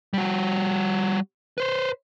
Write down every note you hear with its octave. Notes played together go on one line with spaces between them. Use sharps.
G3 F#4
B4 C5